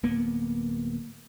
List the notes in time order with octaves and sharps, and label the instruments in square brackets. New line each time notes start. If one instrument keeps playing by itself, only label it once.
[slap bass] D1 A#3 B3